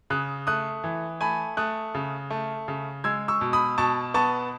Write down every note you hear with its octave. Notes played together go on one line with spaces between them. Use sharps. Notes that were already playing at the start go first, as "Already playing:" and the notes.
C#3 D#6 F#6
A3 D#6 F#6
E3
A3 G#5 B5
A3 D#6 F#6
C#3
A3
C#3
G#3 E6 G#6
C#6 E6
B2
B5 D#6
B2 A5 C#6
B3 A5 C#6